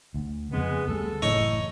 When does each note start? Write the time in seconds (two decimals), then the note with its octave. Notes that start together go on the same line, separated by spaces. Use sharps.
0.14 D2
0.53 F2 C#3 G#3 B3
0.88 D2 G3 G#3 A4
1.22 F#1 A2 E3 D#4 C#5 C#6